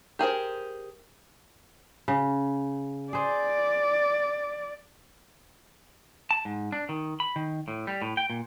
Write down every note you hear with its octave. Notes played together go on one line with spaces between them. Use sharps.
G4 G#4 A#4 C5
C#3
G#4 C5 D5
A5
G#2
D4
D#3
B5
D#3
A2
G3
A2
G5
A#2